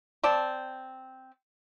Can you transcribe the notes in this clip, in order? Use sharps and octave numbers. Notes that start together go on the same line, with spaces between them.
C4 D5 A5